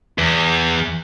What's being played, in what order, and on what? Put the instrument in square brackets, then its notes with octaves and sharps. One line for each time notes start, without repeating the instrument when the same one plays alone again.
[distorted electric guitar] E2